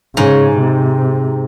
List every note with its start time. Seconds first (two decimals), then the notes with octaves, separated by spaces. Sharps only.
0.16 G#2 C#3
0.57 C3